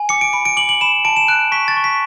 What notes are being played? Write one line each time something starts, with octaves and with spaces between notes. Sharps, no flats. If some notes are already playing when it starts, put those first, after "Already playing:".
Already playing: G#5
D6 C#7
D7
B5 D7
D7
D6 F#7
F#7
B5 E7
A5 D7
E7
F#6 D7
C#6 B6
A6
C#6
B6